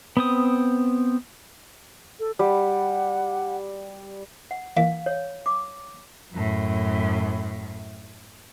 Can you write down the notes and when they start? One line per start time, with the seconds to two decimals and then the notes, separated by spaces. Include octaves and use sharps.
0.17 B3 C4 D#6
2.20 A4
2.39 G3 F#5
4.51 F#5
4.77 E3 A#3 F5
5.06 C#5
5.46 D6
6.33 F#2 A2